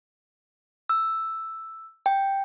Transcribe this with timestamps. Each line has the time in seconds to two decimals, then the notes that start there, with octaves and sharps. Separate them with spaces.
0.89 E6
2.06 G5